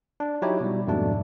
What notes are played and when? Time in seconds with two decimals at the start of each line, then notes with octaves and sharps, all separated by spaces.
0.20 D4
0.42 F#3 D#4 E4 G4 C#5
0.60 B2 G3
0.87 F2 G#2 B2 A3 D4